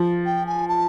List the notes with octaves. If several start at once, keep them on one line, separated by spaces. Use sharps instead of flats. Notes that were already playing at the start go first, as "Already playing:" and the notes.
Already playing: F3
G5
G#5
A5